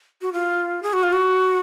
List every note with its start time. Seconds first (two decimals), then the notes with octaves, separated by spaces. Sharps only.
0.22 F#4
0.33 F4
0.83 G#4
0.93 F#4
1.03 F4
1.13 F#4